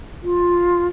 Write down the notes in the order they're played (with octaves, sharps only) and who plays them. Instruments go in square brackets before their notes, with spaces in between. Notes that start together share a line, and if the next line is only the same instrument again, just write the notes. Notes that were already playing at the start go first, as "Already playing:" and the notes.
[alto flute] F4